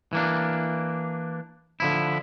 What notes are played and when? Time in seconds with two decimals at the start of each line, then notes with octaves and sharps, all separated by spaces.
0.13 E3 A#3 D4
1.80 D3 F3 E4